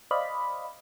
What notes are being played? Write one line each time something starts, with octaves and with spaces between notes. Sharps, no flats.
C5 D5 D#5 F5 B5